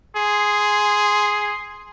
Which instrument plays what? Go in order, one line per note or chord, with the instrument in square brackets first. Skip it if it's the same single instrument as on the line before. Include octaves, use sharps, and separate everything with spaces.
[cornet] G#4 [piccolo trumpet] C6